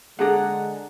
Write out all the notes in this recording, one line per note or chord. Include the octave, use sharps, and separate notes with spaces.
D3 G#3 D4 G#4 A4 F#5 A#5